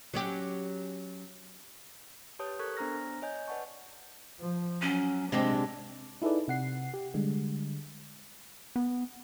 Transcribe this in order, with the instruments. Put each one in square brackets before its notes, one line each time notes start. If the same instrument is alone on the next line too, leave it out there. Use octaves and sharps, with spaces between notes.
[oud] F#3 C#4 G4
[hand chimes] G4 B4 C#5 A5 D#6 G6
A4 A#4 C#6 F#6 G#6
B3 D4 C5 A#5 F6 A#6
C#5 D#5 G#5 G6
B4 D5 F#5 A5 C#6
[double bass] F3
[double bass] F#3 [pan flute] C#4
[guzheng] C3 G#3 C4 [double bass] D4 [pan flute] D#5
[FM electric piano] D#4 E4 G#4 A4 B4 D5
C3 F#5 C7
G4
D3 G3 G#3
[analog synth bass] B3